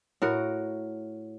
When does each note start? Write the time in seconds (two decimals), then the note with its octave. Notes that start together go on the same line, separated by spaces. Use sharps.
0.22 A2 F#4 A#4